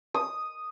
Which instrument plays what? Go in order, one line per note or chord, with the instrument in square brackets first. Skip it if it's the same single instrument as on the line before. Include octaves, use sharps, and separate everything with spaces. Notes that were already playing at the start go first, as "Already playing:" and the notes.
[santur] D#6